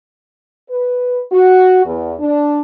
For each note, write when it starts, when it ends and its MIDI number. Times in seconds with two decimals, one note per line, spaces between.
0.69 1.20 71
1.31 1.81 66
1.85 2.13 40
2.19 2.61 62